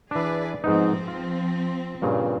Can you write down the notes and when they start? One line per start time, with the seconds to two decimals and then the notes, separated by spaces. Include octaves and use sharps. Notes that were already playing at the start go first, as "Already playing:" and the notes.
0.11 E3 D4 G#4 B4 D5
0.64 G#2 F3 B3 C4 D#4
1.08 F4
2.02 G2 A#2 C#3